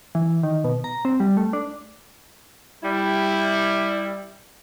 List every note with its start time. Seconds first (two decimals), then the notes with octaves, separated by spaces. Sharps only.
0.15 E3
0.43 D#3
0.64 B2
0.84 A#5
1.05 C4
1.20 G3
1.37 A3
1.53 D4
2.83 G3 E4